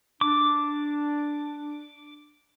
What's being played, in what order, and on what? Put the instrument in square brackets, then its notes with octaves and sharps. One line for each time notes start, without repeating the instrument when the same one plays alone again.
[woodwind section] D4 [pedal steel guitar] D6